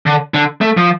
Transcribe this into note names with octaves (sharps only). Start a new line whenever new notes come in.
D3
D3
A3
F3